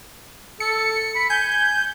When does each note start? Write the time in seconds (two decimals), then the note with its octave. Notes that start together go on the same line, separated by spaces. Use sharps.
0.60 A4 C#7
1.16 B5
1.30 G#5 G6